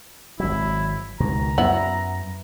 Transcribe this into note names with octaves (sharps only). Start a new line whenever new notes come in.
G#1 F#3 E4
C#2 B2 D#3 A#5
F#2 B3 E4